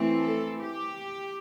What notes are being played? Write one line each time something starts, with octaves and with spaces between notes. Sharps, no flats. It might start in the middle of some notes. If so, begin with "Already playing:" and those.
Already playing: E3 A3 C4
A4
G4